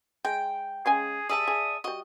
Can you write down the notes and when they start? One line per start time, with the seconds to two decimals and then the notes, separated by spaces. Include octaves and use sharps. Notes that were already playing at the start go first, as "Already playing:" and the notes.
0.25 G#3 G5
0.86 C#3 G#3 G#4 G#5
1.29 G3 G#4 D5 E5 A5 D#6
1.48 G#4
1.84 G3 F#4 D#5